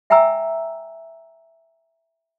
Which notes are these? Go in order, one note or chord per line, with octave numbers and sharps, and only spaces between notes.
E5 G5 G#5 A#5 E6